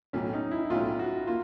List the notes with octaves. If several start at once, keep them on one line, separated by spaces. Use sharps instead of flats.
B1 A2 F#3 C#4
D#4
E4
B1 A2 F#3 F4
F#4
A#3 F4